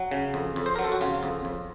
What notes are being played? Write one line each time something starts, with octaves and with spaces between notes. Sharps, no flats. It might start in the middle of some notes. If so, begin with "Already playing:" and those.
Already playing: F#3 F#4
C#3
F2
F2
C5
F#3 A#4
A4
F#4
C#3 F4
F2
F2